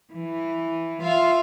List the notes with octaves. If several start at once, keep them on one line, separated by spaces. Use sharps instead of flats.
E3
F4 E5 F5